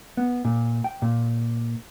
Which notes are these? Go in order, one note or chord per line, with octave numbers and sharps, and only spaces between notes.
B3
A#2
G5
A#2